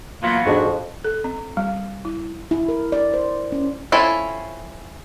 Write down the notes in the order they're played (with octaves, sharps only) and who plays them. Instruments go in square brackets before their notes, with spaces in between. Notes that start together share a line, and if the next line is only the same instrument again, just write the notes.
[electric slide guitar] E3 F#3 B3 [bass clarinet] A#3 [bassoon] F4
[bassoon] F2 [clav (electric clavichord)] G#2 G#3 D4 [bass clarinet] F#4
[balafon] A4
C4
G3
E4
[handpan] E4
A#4
D5
C5
C#4
[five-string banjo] C4 C#4 E4 F4 A4